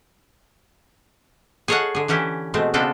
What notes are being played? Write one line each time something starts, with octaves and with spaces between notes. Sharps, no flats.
G#4 A4 C#5 D#5 F5 F#5
D3 G#4
D3 E3 C#4 E4 G4
B2 G#3 A3 C4
C#3 B3 C4 D4 F4 A4